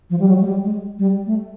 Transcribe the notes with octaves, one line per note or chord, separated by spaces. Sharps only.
F3
G3
F#3
G#3
G3
G#3
G3
A3